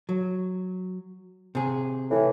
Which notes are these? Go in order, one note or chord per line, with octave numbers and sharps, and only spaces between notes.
F#3
C3 G#4
A2 E3